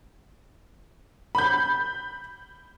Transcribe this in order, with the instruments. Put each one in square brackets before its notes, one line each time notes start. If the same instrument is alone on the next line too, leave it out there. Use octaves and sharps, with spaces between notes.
[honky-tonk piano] B5 G6